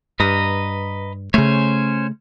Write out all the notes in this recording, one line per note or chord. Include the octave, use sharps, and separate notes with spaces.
G2 B4 D#5 A#5
C#3 A3 C#4 C5 C#5